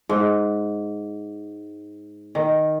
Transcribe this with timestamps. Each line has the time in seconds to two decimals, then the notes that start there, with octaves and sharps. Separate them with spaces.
0.09 G#2
2.35 D#3